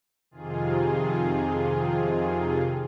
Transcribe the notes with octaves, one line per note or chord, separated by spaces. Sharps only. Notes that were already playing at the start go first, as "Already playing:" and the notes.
F2 C3 D#3 F4 G#4